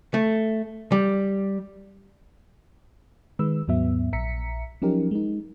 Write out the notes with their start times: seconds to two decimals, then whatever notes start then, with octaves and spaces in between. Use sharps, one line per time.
0.14 A3
0.92 G3
3.39 D#3 G#3 B4 E6
3.68 D#2 G#2 F#3 B3 E5
4.13 A#1 E5 A#5 B6 C#7
4.82 F3 F#3 C#4 D#4 G4 A#4
5.11 G#3 D#4